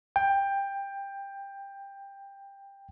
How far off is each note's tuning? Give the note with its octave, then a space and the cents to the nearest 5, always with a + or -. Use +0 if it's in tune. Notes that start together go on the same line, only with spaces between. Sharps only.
G5 +15